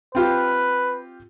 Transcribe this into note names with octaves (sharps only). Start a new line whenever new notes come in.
C4 F4 G4 B4